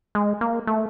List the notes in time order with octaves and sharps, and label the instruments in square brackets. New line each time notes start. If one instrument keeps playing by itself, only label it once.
[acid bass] G#3
A#3
A3